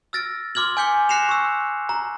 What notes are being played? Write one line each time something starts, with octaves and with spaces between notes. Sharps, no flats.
E6 F6 A6 A#6 D7
C6 D6 F6 G#6 F#7
G#5 D6 G6 B6 C#7 G7
F#6 A#6 C7 C#7 E7 F7
C#6 E6
A#5